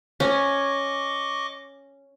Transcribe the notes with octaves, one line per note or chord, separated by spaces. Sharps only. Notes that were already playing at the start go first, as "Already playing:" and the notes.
C#4 D#5 C#6 D6